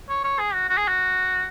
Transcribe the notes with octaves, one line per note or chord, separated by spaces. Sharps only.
C#5
C#5
G#4
F#4
F#4
G#4
F#4